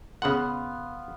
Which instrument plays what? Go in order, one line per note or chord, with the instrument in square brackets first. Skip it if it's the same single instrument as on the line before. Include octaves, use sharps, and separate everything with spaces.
[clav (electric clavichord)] C#3 F#5 [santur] B3 F5 C6